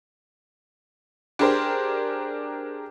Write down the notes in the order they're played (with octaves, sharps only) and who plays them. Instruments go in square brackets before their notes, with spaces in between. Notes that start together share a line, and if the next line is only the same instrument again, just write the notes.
[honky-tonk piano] D4 G4 G#4 A#4 C5